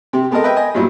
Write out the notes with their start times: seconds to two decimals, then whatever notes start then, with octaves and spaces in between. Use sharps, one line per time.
0.13 C3 C4 G4
0.31 G#3 B3 C4 A4 A#4 D#5
0.44 B4 D#5 E5 G5
0.56 D#5 G#5
0.75 G2 A#2 F#3 G3 B3 E4